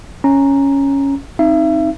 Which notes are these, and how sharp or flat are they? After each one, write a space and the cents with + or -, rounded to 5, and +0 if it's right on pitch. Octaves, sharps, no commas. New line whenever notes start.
C#4 +0 A#5 +0
C4 +30 D#4 +15 E5 +35